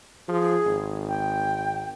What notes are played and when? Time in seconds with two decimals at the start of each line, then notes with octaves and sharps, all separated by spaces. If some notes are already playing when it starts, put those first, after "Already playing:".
0.29 F3 G#4
0.66 G#1
1.08 G5